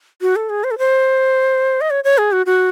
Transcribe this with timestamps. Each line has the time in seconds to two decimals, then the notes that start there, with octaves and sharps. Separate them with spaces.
0.22 F#4
0.36 A4
0.50 G#4
0.64 C5
0.71 A4
0.78 C5
1.81 D#5
1.90 C#5
2.04 C#5
2.18 G#4
2.32 F#4
2.46 F#4